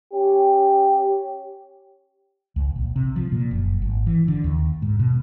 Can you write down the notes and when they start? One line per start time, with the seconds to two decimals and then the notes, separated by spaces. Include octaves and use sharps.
0.12 C#4 G4
2.56 C#2
2.76 A#1
2.96 C3
3.16 F3
3.32 A#2
3.51 F#1
3.82 G#1
4.07 E3
4.28 D3
4.44 D#2
4.82 G#2
5.00 B2